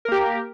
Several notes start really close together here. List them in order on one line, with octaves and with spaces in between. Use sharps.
A#4 A#3 G4